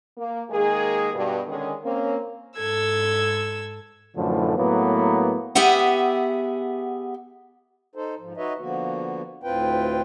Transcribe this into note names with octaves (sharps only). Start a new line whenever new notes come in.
A#3
D#3 G#3 A#3 G#4
G2 B2
D3 D#3 G#3 C#4 G#4
A#3 C4 C#4
G#2 A4 E6 G#6
F#2 A2 D3 E3 F3
A2 F#3 A#3 B3
B3 G4 G#4 E5 F#5
D#4 A4 C5
G#2 F3
D#4 F#4 B4 C#5 D#5 E5
D3 F3 A#3 B3 F#4
D2 A2 C4 F4 B4 G5